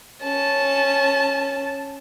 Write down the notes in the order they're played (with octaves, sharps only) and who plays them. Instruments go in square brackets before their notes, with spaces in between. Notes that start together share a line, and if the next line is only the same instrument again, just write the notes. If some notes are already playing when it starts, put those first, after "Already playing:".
[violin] C#4 A5